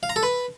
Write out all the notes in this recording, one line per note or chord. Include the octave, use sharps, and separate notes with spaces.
F5
A#5
A4
B4